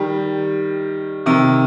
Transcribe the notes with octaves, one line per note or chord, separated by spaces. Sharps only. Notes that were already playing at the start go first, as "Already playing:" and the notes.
Already playing: D#3 G3
C3 D#3